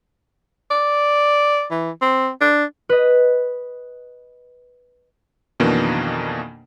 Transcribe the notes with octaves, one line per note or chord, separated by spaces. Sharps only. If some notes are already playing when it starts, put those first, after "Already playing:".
D5
E3
C4
D4
B4 D#5
F2 B2 D#3 E3 A#3 D4